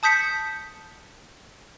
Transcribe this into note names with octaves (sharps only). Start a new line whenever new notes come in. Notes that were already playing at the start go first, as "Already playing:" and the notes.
A5 D#6 G6 B6 C#7